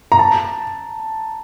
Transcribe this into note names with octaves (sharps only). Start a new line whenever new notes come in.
A#5
A5